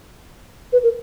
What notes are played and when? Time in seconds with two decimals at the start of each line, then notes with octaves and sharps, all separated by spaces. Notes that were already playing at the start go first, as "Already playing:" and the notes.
0.73 B4
0.83 A#4